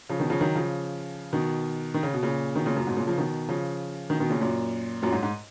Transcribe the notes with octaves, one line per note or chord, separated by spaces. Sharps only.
C#3 F3
B2 D#3
C#3 F3
D#3 F#3
C#3 F3
B2 D#3
D#3
C#3
B2
A#2 C#3
B2 D#3
A#2 C#3
F#2 A#2
G#2 B2
A#2 C#3
C#3 F3
B2 D#3
C#3 F3
B2 D#3
B2 D#3
A#2 C#3
F#2 A#2
F#2 A#2
G#2
G#2